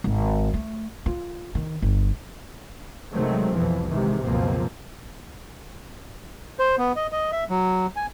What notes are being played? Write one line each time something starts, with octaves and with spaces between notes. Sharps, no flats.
G#1
A3
F4
D#3
G1
C3 D#3 F#3 G#3 A3 C4
C2 F2 B2 E3 F3
G#2 C3 D#3 E3 G#3
C#2 F#2 B2 F3 A#3 C4
C5
B3
D#5
D#5
E5
F#3
G#5